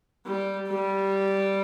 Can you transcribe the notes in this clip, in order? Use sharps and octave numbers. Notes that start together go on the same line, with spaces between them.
G3
G3